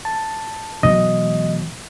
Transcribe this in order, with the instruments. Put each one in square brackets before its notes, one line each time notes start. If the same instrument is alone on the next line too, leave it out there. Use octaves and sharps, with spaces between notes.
[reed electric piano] A5
[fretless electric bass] B2 F#3 [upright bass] E3 G#3 [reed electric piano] D#5